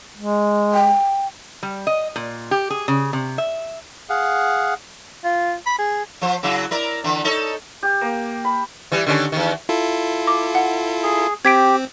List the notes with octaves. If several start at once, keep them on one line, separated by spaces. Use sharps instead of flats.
G#3
G5
G3
D#5
A#2
G4
G#4
C#3
C3
E5
G#4 F5 F#5
F4
B5
G#4
F3 C5
C#3 F#3 E4
E4 A#4 D5
D3 E3
D#4 A4 C#5
G4
A#3
B5
E3 G3
D3 D#3 C#4
E2 D#3
E4 F4 A4
D6
F#5
G#4
C4 G4 G#6 B6 D7